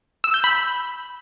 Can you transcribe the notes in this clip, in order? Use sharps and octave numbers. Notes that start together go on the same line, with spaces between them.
E6
G6
B5